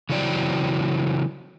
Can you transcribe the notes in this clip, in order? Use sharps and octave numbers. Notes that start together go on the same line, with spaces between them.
C#3 E3 F#3 C4 D5 G5